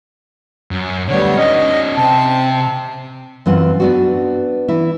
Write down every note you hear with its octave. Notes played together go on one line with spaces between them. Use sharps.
F#2
D3 G3 A3 B3 C#5
C#4 D#4 D#5
C3 C4 A5
F#2 E3 C4 F4 F#5
B3 D4 F#4
E3 E4